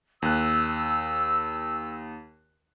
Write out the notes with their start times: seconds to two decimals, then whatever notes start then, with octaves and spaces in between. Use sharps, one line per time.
0.22 D#2 E6 F#6